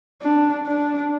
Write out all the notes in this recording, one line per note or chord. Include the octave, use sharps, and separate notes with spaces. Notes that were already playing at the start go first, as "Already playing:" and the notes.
D4
D4